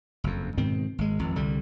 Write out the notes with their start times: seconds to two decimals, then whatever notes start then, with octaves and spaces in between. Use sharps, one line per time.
0.24 F#1 F2
0.58 G#2 B2 D#3 C4
0.98 G#1 G#3
1.19 G#1 F2
1.36 C2 D3 G3